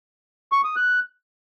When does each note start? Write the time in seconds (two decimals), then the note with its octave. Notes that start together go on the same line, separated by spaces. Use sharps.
0.52 C#6
0.64 D#6
0.76 F#6